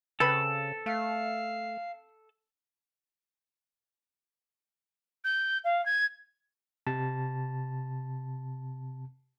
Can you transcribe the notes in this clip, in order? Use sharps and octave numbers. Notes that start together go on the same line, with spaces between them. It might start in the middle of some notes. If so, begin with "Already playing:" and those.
C#3 C4 A4 B4 B5
A3 F5
G6
F5
G#6
C3 A5